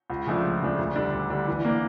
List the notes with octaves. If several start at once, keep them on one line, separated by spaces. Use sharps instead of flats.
C#2
C#3 F3 A3 D4
C#2
C#3 F3 A3 D4
D2
D3 G3 D4
D2
D3 G3 D4
E3
A#3 D4